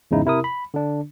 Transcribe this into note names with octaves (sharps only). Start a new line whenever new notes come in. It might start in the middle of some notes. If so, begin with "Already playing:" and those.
E2 G#2 C#3 D#4 E4
C3 E4 A#4 D#6
B5
D3 D4